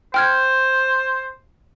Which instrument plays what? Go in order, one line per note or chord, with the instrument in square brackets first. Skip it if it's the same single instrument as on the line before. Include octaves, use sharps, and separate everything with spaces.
[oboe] C5 [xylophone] G5 F6 G#6